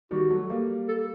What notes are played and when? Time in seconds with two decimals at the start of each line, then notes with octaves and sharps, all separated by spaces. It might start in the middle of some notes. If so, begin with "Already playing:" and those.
0.11 D#3 G3 F#4
0.30 F#3 A3
0.50 G3 A#3
0.88 A4